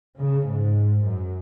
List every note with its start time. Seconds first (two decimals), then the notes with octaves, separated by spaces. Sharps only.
0.20 C#3
0.49 G#2
1.08 F#2